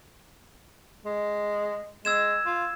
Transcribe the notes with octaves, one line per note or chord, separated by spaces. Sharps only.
G#3
G#3 E6 G#6 E7
F4